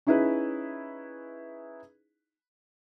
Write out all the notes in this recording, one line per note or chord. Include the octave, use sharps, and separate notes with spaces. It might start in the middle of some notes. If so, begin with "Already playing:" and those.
C#4 D#4 E4 G#4 B4